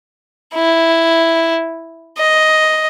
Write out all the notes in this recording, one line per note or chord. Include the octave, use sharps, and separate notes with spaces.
E4
D#5